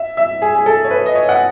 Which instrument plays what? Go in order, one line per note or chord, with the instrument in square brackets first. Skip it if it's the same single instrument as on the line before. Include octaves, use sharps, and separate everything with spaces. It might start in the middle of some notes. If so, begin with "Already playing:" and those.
Already playing: [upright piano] E5
E5
G#4
G#4
A4
C#5
B4
D#5
C#5
F#5